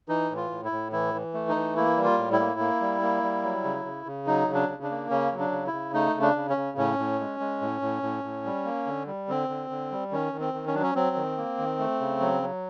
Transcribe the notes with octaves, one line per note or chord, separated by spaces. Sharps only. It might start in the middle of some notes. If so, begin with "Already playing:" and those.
E3 D#4
A2
F4
A2
E4
A2
E3 E4
E3
A3
D#4
E3
A#3 E4
G3
F4
A2
E4
A#3
A#3
G3
A#3
G3
F#3
C#3
C#3
C#3
F#3 D#4
C#3
D4
C#3
D4
A#3
C#3 C#4
F#3
D4
C#3
E4
C#3
A3 D#4
C#3
D4
C#3
C#4
C#3
A2 C#4
A2
G#3
G#3
A2
A2
A2
A2
G3
A#3
D3
G3
D3 C4
D3
D3
G3
D#3 C#4
D#3
C4
D#3
C#4
F#3 D4
C#4
F#3 C4
D#3
A#3
D#3
A3
C#3
F#3
F#3